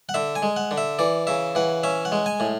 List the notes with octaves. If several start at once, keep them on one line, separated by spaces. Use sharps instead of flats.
F#5
D3 E5
G#5
G#3
F#5
D3
E5
E3 D5
C#3 E5
E3 F#5
C#4 E5
F#5
G#3
G#5
A2